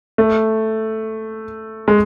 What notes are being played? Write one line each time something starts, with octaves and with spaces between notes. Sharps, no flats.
A3
G#3